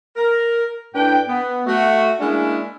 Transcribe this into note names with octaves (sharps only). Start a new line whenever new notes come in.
A#4
A2 D4 B4 G5
B3
A3 F#4
G#3 A#3 C#4 D4 E4 G#4